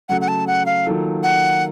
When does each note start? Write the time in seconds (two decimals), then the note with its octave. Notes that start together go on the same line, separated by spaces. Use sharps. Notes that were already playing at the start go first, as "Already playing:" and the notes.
0.09 C#3 F#3 A3 F#5
0.21 F#5
0.28 A5
0.47 F#5
0.66 F5
0.85 D#3 F#3 A#3 F4 A4
1.23 F#5